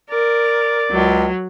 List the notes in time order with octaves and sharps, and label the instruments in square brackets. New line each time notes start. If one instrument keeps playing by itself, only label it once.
[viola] A#4 [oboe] D5
[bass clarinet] C#2 [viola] F#3